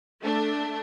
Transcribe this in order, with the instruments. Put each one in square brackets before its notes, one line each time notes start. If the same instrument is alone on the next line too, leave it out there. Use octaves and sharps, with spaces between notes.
[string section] A3 D4